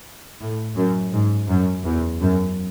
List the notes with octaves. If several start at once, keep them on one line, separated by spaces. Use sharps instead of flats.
A2
F#2
G#2
F#2
E2
F#2